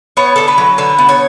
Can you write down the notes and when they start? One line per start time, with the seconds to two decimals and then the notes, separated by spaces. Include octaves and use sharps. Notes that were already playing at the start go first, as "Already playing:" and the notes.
0.17 B3 C#5
0.36 D3 A4
0.48 B4
0.58 F#3
0.78 D3 B4
0.98 B3
1.09 C#5